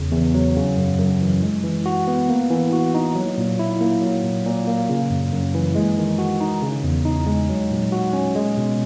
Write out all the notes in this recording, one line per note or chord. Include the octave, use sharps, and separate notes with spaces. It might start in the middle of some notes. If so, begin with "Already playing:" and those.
Already playing: E2 C#3
E2
F#3
C#3
F#2
F#2
E3
G#3
E3
F#4
B3
A#3
E3
F#4
D#4
F#3
A#2
E4
A#3
F#3
A#2
A#2
A#3
C#3
F#2
F#2
E3
G#3
D#3
F#4
D#4
C#3
E2
D#4
G#3
F#3
A#2
F#4
C#4
G#3
B2